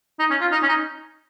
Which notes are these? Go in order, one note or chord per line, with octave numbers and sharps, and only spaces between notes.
D#4
C#4
F4
D#4
C#4
D#4